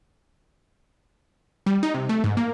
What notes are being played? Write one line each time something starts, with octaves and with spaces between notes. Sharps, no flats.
G3
D#4
C3
A3
G#2
A#3